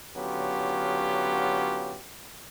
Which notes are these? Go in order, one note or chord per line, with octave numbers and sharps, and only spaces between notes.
D3 F#3 B3 C#4 F4 G4